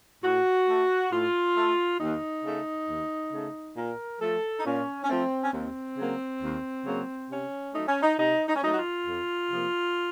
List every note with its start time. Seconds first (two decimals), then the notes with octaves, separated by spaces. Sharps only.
0.24 A2 F#4
0.68 A3
1.12 A2 F4
1.57 A3
2.00 D#2 D#4
2.45 C#3 A3
2.88 D#2
3.33 C#3 A3
3.77 A#2 A#4
4.21 F3 A3 A4
4.60 D#4
4.65 A#2 C#4
5.04 C#4
5.09 F3 A3 C4
5.44 C#4
5.53 D#2 C4
5.98 C#3 F#3 A#3
6.42 D#2
6.86 C#3 F#3 A#3
7.31 C3 C#4
7.74 F#3 A3 D#4
7.88 C#4
8.03 D#4
8.19 C3 D#4
8.48 D#4
8.56 C#4
8.63 F#3 A3 D#4
8.73 F#4
8.78 F4
9.07 F2
9.51 C3 F3 A#3